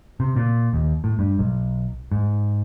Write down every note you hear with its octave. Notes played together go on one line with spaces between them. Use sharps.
C3
A#2
D#2
A2
G2
B1
G#2